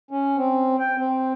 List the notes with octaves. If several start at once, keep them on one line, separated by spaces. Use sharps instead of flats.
C#4
C4
G5
C4